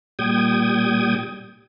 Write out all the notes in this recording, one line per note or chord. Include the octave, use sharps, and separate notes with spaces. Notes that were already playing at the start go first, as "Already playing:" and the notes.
A#2 G3 G5 D#6 G#6